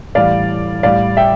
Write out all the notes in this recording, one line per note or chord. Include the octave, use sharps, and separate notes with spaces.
A2 E3 G3 D5 F5
A2 G3 D5 F5
E5 G5